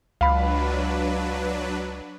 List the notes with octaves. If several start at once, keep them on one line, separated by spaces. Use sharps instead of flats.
C#2 F#3 D4 B4 F5 B5